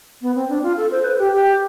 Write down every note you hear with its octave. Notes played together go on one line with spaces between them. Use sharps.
B3
C4
D4
F4
A4
C5
B4
G4
G4